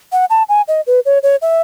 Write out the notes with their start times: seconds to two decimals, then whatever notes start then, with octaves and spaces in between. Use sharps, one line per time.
0.12 F#5
0.30 A5
0.49 G#5
0.68 D#5
0.87 B4
1.06 C#5
1.23 C#5
1.42 E5